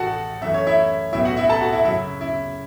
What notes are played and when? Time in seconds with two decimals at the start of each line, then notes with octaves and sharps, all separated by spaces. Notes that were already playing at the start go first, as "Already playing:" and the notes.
Already playing: A1 A2 A3 F#4 A4 F#5 A5
0.41 F#2 E3 A3 E5
0.54 C#5
0.67 E4 E5
1.13 B1 A2 F#3 B3 E4 E5
1.25 F#4 F#5
1.37 E4 E5
1.49 A4 A5
1.61 F#4 F#5
1.72 E4 E5
1.84 F#2 C#3 F#3 E4 E5
2.21 E4